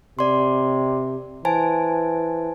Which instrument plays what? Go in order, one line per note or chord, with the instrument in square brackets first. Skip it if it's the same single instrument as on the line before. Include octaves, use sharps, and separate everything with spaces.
[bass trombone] C3 [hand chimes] D5 C6
[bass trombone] E3 [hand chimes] C5 G#5 A5